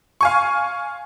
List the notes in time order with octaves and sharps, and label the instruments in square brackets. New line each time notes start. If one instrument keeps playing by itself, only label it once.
[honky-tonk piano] F5 G#5 C#6